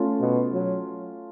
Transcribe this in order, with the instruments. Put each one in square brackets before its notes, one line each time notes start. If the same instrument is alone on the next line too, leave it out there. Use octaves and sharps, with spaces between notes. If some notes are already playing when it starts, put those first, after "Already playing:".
Already playing: [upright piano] A3 C#4 F4
[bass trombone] B2
F#3